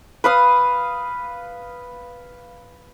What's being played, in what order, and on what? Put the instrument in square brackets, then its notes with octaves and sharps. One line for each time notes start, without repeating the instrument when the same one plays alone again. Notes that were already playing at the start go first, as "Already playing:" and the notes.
[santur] B4 F5 D#6